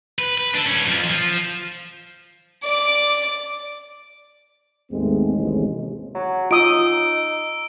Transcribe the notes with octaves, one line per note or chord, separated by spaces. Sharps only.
B4
B4
D4 A4
G3 C#4
F2 F3
F3
D5 D6
D#2 G#2 G#3 A3 B3 C4
A1 D#2 C3 G#3
F#3
D#4 F4 D#6 E6 D7